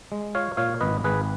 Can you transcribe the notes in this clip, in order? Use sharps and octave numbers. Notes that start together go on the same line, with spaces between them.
G#3
F4 C#5 F5
A#2 C#5 F5
G#1 B4 D#5
G#1 G#4 B4